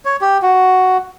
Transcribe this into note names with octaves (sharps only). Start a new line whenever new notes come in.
C#5
G4
F#4